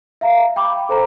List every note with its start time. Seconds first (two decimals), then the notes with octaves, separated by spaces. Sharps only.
0.21 E5 F5 A#5
0.56 G5 B5 D6
0.89 A4 C5 G5 A#5